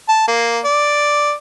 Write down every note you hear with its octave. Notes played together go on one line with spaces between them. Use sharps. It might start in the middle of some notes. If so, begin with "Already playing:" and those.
A5
A#3
D5